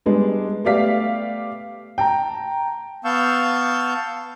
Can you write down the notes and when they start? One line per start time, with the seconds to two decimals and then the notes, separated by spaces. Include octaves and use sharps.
0.06 G3 G#3 B3 D4
0.65 A3 B3 G4 D5 F5 B6
1.98 G5 A5 A#5
3.05 B3 F5 A5 C#6 E6 G6